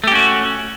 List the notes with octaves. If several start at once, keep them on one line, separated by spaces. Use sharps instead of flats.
A3 C#4 F#4 G4